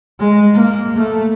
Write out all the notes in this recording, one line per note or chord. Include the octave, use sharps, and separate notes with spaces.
G#3
A#3
A3